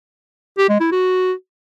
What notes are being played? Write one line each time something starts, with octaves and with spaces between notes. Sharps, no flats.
G4
G#3
E4
F#4